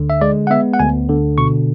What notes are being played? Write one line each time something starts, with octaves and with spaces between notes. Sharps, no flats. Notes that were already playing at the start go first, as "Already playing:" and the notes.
Already playing: D2 D3
E5
G#3 D5
F#5
B3 E5
F#5
D2 G#5
D3
B2 C#6